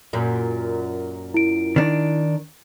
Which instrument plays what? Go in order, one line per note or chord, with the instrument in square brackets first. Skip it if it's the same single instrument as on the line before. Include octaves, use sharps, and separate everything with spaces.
[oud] F#2 A#2
[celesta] E4 D7
[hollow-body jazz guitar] D#3 D4